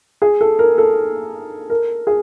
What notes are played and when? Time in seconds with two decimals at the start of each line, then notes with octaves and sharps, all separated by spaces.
0.22 G#4
0.41 A4
0.59 A#4
0.78 A4
1.70 A#4
2.07 G#4